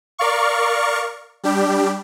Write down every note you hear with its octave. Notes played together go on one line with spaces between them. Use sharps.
A#4 D5 F5 C#6
G3 D4 G4